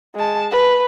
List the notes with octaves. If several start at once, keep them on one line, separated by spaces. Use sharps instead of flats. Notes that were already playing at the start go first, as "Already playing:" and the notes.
G#3 A5
B4